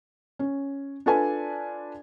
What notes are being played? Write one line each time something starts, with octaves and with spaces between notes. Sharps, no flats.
C#4
D4 F4 A4 B4 D5 G#5